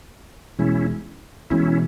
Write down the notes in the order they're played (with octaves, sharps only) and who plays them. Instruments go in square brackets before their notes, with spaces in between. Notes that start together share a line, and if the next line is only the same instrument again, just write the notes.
[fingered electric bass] E1 E2 B2 G#3 [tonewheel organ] C#4 E4
[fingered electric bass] E1 E2 B2 G#3 [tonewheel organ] C#4 E4